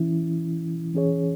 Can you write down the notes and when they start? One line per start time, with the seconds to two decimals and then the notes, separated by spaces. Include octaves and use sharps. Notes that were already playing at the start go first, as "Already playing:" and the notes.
Already playing: E3 C#4 E4
0.94 E3 C#4 G#4 C#5